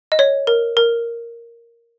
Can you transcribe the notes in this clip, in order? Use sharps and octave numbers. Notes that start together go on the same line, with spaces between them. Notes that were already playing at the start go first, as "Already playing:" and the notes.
D#5
C#5
A#4
A#4